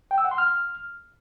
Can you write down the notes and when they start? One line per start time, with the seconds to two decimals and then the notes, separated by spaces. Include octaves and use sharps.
0.11 G5
0.18 E6
0.25 F#5
0.31 C6
0.38 F6